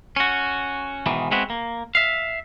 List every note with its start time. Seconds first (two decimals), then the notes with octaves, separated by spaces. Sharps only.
0.16 C#4 F#4
1.06 G#2 B2 D#3 E3
1.31 G#3 B3 C4 E4 F#4
1.50 A#3
1.95 E5 F5